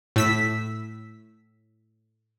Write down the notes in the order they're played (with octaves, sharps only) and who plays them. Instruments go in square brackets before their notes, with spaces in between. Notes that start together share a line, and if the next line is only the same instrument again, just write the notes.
[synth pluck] A2 E6 B6